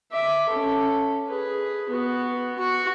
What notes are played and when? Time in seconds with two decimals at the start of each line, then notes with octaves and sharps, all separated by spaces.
0.11 E5 D6
0.50 C#4 A4
1.28 G#4 B4
1.89 B3 F#4
2.58 F#4 C#6